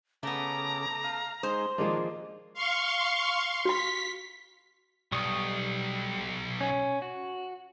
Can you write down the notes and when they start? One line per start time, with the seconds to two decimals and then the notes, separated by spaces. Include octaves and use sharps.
0.23 C#3 A3 B3 A#5 D6
1.04 F5
1.43 G#3 D#4 C5
1.78 D#3 F3 G#3 A#3 D4
2.54 F5 C6 C#6
3.65 F#4 B5 B6
5.12 B1 G3 C#6 D#6
6.61 C#4
7.02 F#4